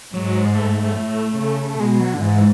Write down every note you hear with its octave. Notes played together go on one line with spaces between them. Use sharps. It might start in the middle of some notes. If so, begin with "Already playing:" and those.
G#2 F#3
G#3
A3
A2 A3
C#3
B2 G#3
F#3
D3
G#2 E3